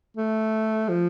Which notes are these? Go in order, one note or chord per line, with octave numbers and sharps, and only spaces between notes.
A3
F3